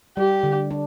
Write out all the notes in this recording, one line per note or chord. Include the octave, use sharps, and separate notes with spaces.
G3 G4
D3
D4